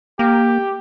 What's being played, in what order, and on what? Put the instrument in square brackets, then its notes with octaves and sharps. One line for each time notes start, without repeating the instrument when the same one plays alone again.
[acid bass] A#3 [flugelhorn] G4